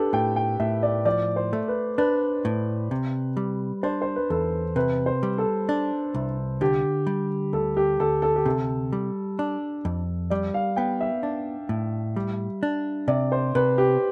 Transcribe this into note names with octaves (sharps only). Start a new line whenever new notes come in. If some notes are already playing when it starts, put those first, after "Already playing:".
Already playing: D4 G4 A4 B4
A2 G5
G5
A2 E5
D5
F3 D5
C5
A3
B4
D4 B4
A2
C3
G3
D4 C5
C5
B4
E2 A4
C3 B4
C5
G3
A4
D4
C2
D3 G4
G3
D2 A4
G4
D2 A4
A4
G4
C3 A4
G3
D4
F2
G3 D5
F5
B3 G5
E5
D4
A2
G3
D4
C3 D5
C5
C3 B4
G4